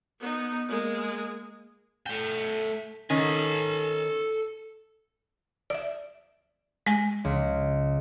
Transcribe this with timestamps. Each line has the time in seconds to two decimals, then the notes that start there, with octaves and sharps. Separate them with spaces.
0.20 B3 D#4
0.69 G#3 A#3
2.06 A3 G5
3.10 D#3 C#4 A4 G#5
5.70 D5 E5
6.87 G#3 G#5 A#6
7.24 C#2